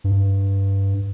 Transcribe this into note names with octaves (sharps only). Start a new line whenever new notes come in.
G2